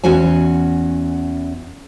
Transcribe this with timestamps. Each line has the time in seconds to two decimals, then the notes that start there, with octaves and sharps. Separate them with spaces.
0.04 E2 C#4 F#4 C5 G#5